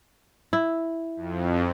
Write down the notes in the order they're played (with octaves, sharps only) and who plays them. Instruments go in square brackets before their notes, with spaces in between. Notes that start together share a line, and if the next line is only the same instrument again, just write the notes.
[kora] E4
[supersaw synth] F2